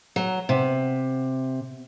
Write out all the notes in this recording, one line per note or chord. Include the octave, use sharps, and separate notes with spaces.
F#3
C3